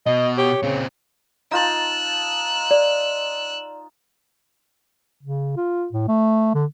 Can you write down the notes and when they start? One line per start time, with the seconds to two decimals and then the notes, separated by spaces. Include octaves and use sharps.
0.06 B2 D#5
0.38 G4 C#5
0.63 A#2 C#3 C4
1.51 D#4 F4 A5 E6 F#6
2.71 D5
5.23 C#3
5.56 F4
5.93 A2
6.08 A3
6.55 D3